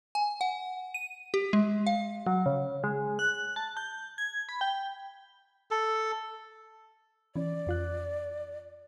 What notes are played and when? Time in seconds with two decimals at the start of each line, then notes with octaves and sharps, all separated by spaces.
0.15 G#5
0.41 F#5
0.94 D#7
1.34 G4
1.53 G#3
1.87 F5
2.27 F#3
2.46 C#3
2.84 G#3
3.19 F#6
3.56 A5
3.77 G6
4.18 G#6
4.49 B5
4.61 G5
5.71 A4
7.36 E3 C#4 D5
7.67 F2 F4 F#6